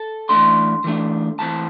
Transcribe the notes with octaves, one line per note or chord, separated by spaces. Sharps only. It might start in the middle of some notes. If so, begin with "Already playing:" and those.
Already playing: A4
E3 A3 D4 C6
E3 A3 D4
A2 E3 C4 A5